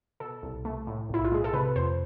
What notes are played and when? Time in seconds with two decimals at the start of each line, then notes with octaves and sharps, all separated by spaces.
0.20 B2 A4
0.43 C2
0.65 A3
0.87 A2
1.09 B1 E4
1.25 F4
1.32 G#3 G#4
1.44 A4
1.53 C3 B4
1.76 F2 C5